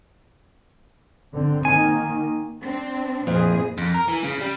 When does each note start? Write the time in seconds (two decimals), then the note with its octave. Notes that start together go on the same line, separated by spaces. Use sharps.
1.34 D3 C4
1.65 D#3 A#3 G#5
2.62 C4 D4
3.27 F2 A#2 E3 G#4
3.78 F2
3.94 A#4
4.08 E3
4.24 C#3
4.41 G3